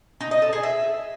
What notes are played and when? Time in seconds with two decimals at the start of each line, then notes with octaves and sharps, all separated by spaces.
0.21 D#4
0.31 D#5
0.42 A4
0.53 G#4
0.63 E5